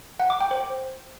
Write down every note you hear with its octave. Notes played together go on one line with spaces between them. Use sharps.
F#5
D6
G5
C5